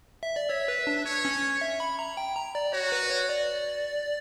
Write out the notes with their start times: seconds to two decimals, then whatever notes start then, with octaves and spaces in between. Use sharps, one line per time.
0.23 E5
0.36 D5
0.50 C#5 E5
0.68 B4
0.87 D4
1.05 C#5
1.25 C#4
1.61 E5
1.80 B5
1.99 A#5
2.17 G5
2.36 A#5
2.55 D5
2.73 F#4 C#5
2.92 B4
3.10 C#5
3.29 D5